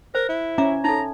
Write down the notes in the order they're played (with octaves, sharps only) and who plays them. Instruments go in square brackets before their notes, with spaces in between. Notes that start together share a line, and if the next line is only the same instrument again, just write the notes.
[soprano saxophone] A#4 [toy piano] C5
[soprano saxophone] E4
[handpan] C#4 [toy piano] E5 A#5 D6
[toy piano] D#4 A4 [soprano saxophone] A#5